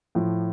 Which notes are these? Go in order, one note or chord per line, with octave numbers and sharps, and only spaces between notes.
A2 F3